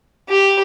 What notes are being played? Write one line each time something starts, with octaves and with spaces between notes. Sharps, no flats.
G4